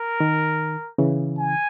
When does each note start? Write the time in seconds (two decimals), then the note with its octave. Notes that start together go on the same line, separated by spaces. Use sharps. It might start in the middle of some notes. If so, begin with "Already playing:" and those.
Already playing: A#4
0.20 D#3
0.98 C#3 E3
1.38 G#5